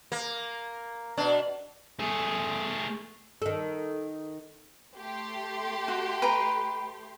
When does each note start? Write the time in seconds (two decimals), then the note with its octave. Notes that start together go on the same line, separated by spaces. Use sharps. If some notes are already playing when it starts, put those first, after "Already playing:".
0.12 A#3
1.17 B2 D4
1.99 A3 G#4
3.42 D#3 A4
4.97 A3 G4 C6
5.88 F#4
6.22 B4 G5 A#5